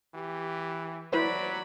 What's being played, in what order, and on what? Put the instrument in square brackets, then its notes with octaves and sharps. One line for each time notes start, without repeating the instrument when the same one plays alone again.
[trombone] E3 [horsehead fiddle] G4
[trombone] F#3 [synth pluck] E4 B4 C5 [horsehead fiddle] D5 B5